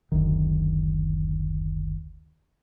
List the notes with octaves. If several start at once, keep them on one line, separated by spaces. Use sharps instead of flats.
F#1 D2 D#3